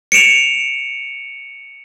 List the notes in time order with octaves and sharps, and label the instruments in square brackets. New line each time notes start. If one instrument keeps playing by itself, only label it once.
[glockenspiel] C#7 D7 E7 F7